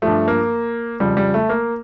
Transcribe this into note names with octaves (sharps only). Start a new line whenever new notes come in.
G2 F3 A3
A#3
F2 C#3 F3 G3
G3
A3
A#3